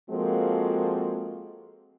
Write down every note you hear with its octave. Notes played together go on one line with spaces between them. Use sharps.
F3 G#3 A#3 C4 F#4 A4